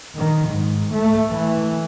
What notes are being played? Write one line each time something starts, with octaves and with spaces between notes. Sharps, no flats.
D#3
G#2
A3
E3